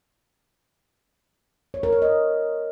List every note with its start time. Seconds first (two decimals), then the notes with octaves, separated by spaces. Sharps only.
1.74 C#5
1.83 A#4
1.93 C#5
2.02 D#5